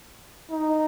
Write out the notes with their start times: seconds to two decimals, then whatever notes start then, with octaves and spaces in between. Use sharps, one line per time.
0.51 D#4